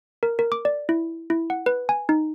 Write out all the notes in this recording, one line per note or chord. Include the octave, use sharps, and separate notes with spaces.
A#4
A#4
D6
D5
E4
E4
F#5
B4
G#5
D#4